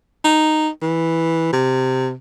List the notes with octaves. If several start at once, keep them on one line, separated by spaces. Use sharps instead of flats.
D#4
E3
C3